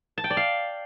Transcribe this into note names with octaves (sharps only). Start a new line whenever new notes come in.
A5
G5
D5
F5